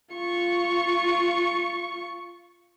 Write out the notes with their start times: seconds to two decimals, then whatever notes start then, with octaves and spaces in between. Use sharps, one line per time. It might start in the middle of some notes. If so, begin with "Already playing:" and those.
0.14 F4 C#6